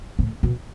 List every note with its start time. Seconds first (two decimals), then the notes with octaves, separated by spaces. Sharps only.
0.19 A2
0.43 B2